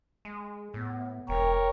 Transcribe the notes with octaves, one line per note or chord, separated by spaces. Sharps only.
G#3
A2 B3
E1 A#4 C#5 G5